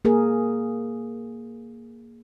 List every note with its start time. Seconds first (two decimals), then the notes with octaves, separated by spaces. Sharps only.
0.05 A#3 G#4 A#4